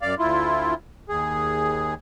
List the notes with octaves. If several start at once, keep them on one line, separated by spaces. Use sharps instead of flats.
F#2 D5 F5
D2 E4 F4
D#2 G#4